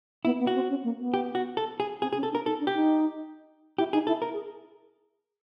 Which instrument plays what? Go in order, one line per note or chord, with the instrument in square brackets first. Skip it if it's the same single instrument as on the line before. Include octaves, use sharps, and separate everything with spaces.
[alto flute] B3 [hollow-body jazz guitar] E4
[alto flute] B3
[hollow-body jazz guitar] F#4
[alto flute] C4
C#4
A#3
B3
[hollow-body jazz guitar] G4
F#4
A4
G#4
[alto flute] C4 [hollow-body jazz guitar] G#4
[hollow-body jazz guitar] G#4
[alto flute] C#4
[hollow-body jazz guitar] A4
[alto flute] D4
[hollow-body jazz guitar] A#4
[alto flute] D#4 [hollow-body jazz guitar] A4
[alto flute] D4
[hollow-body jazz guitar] G4
[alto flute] D#4
[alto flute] E4 [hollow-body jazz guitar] G4
[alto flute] D#4 [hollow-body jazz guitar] G#4
[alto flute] E4 [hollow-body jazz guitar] A4
[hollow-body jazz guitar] A#4
[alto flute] G#4